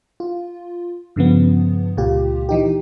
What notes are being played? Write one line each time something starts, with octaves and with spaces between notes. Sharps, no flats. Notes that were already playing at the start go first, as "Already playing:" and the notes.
F4
G2 C#3 F3 B3
C#2 A#2 F4 G4
E3 D#4 G4